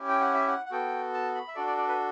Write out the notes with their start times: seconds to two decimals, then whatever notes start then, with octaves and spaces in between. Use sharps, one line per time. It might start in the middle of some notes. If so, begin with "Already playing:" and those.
Already playing: C#4 E4 G4
0.08 G5
0.21 F#5
0.34 E5
0.47 F#5
0.66 F#5
0.71 B3 F#4 A4 G5
1.14 A5
1.34 B5
1.48 E5
1.55 D4 F#4 A4 D5
1.67 D5
1.77 D5
1.88 B4